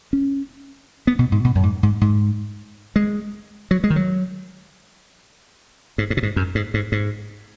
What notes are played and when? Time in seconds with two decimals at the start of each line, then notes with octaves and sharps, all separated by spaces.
0.13 C#4
1.07 B3
1.19 B2
1.32 G#2
1.44 B2
1.55 F#2
1.63 G#2
1.83 G#2
2.01 G#2
2.96 G#3
3.71 F#3
3.84 G#3
3.90 D#3
3.96 F#3
5.98 G#2
6.10 G#2
6.17 B2
6.23 G#2
6.36 F#2
6.55 G#2
6.74 G#2
6.92 G#2